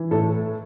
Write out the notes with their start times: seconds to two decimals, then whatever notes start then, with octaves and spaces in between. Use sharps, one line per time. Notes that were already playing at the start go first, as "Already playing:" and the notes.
Already playing: E3
0.11 A2 A4